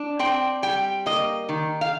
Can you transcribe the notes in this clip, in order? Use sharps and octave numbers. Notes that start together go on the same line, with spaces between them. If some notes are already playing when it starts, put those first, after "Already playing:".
Already playing: D4
C4 G5
G3 G5
A#3 D#5
D#3
F5